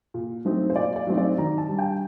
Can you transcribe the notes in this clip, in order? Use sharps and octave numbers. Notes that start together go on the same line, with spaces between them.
A#2
F#3 A3 C4 D#4
C5
A#2 D5
D5
F#3 A3 C4 D#4
D5
D#3 A#5
A5
G3 D4
G5